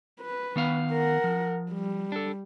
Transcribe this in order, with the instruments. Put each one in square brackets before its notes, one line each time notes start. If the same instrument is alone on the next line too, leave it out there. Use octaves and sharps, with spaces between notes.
[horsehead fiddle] B4
[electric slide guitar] D#3 B3 F5
[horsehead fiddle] A#4 F#5
[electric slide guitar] F3
[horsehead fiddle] G3
[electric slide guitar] D4 A4